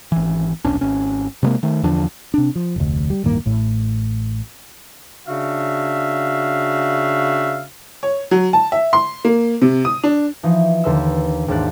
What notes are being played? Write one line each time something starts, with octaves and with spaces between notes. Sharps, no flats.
G#1 E3
D#1 B1 C#4 D4
G#1 C#4
C3 G3 G#3 A#3
D#3 A3
E2 D3 F3 D4
C3 D4
F3
F1 D2
G3
D1 G2 D#3 A#3
A1 A2
C#3 D4 F#4 E5 F5
C#5
F#3
A5
E5
C6
A#3
C3
D#6
D4
E3 F3 D#4
D#2 D3 B4 C6 E6
G#1 D#2 G#2 D4 D5 F#6